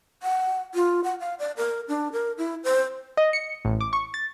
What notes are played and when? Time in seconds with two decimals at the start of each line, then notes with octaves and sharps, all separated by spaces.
0.23 F#5
0.75 F4
1.04 F#5
1.20 F5
1.39 D5
1.57 A#4
1.88 D4
2.12 A#4
2.38 E4
2.64 C5
3.17 D#5
3.33 C#7
3.65 A1
3.81 D6
3.93 C#6
4.14 A6